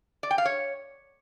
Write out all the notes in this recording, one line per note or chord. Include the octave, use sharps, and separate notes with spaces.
D5
G5
F5
C#5